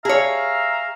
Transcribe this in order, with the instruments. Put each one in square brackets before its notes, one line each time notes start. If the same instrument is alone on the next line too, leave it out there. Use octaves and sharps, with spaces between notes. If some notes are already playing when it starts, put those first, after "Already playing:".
[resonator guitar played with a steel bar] G#4 C#5 [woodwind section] E5 F5 A#5